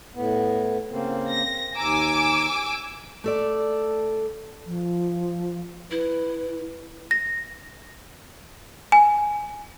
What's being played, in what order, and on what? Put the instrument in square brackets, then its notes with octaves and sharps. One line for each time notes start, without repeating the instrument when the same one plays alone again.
[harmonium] A2 B3
C#3 A#3 C4
[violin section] A#6
[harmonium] D#2 A#5 [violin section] G#5 D6 E6
[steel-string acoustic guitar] A3 A4 D5
[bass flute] F3
[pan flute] E4 [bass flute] B4
[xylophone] A#6
G#5